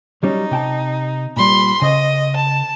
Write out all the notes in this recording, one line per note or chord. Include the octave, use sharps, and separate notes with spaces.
F#3 G3 C#4 D#4
C3 G5 A5
A#2 G3 B5 C6
C#3 C5 D#5
A5